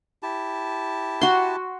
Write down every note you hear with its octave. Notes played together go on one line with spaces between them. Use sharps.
E4 G4 A5
F#4 C6